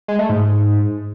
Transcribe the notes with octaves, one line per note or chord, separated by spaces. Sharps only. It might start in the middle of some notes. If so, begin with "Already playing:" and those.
G#3
A3
G#2